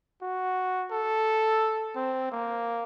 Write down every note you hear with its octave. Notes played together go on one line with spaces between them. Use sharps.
F#4
A4
C4
A#3